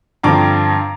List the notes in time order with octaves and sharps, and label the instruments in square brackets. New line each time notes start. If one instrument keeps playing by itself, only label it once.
[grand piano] G2 D3 F3 C4 A#5 D6